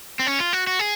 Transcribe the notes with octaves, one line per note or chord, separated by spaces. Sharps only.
C4
C#4
F4
F#4
F#4
G#4